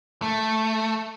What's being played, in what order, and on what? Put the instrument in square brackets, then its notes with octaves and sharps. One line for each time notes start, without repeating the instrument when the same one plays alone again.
[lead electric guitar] A3